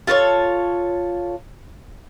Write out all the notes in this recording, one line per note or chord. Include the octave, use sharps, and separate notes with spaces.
F4 A4 C5 C#5